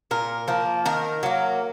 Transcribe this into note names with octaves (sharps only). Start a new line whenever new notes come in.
A#2 A#4
F3 A#3
D#3 A#4
F#3 A#3